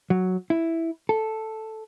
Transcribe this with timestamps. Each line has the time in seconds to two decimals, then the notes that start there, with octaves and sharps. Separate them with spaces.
0.10 F#3
0.50 E4
1.09 A4